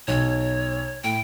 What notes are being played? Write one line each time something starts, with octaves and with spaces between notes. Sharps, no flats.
B1 C#5
A2 G5